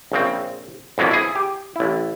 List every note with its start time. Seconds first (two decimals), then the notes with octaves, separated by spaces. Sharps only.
0.12 A#1 C#3 C4
0.98 F2 E3 F#3 A#3 B3
1.11 E4 G#4
1.35 G4
1.76 A1 E4